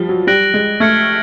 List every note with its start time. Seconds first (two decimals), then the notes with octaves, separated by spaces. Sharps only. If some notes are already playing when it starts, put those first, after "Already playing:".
Already playing: F3 G3 G7
0.09 F#3
0.27 G3 F#6 A#6 D7 F#7
0.54 G#3
0.80 A3 F6 G#6 C#7